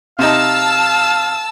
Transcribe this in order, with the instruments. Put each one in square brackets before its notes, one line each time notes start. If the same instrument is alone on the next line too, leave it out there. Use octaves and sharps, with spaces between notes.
[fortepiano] C3 D#4 [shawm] F5 [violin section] A5 E6